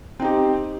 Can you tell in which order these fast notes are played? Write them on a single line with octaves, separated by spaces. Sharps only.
C4 D#4 G4